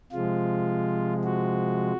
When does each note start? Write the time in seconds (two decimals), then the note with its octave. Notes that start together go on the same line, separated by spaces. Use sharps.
0.12 C3 F3 G#3 F4
1.24 F#4